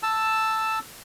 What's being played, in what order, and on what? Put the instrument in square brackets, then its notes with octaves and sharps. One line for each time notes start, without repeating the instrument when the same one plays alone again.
[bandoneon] A5 E6